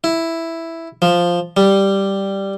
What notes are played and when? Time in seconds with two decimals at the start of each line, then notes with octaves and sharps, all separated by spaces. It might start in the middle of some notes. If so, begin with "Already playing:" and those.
0.04 E4
1.02 F3
1.57 G3